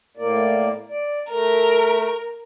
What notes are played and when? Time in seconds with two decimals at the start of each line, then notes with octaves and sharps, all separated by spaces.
0.17 A2 A#3 D5
0.90 D5
1.29 A3 A#4